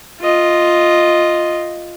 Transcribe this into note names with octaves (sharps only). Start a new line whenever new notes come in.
F4 D#5